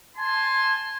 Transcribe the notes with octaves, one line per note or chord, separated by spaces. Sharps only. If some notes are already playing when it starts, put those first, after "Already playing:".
G#5 A5 C6